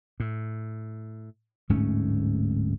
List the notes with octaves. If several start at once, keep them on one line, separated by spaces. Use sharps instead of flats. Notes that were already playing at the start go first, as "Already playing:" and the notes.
A2
D1 G#2 A3 C#4